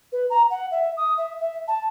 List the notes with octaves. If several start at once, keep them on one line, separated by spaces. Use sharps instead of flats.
B4
A#5
F#5
E5
D#6
E5
E5
A5